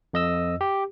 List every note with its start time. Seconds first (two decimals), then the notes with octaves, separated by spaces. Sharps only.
0.13 F2 D#5 E6
0.61 G4